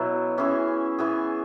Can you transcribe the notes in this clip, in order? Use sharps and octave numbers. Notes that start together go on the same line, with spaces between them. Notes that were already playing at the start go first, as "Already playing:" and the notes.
Already playing: B2 F#3 E4
E3 C#4 E4 G#4
E3 B3 G#4